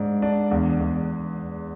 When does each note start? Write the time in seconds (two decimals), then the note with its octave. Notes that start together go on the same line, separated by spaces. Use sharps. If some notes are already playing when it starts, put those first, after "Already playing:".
Already playing: G#2 D4
0.22 D4
0.51 E2
0.80 E2